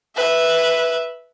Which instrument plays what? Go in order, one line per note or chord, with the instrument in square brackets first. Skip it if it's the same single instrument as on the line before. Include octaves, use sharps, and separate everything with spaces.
[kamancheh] B4 E5